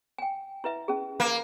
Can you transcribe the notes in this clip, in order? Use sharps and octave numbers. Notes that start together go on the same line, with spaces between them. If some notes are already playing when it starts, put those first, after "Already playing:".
G5 G#5
E4 B4 E5
C#4 G#4
A#3